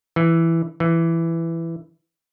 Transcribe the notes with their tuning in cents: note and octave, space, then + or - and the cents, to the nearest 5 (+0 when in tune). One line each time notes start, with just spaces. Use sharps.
E3 +5
E3 +10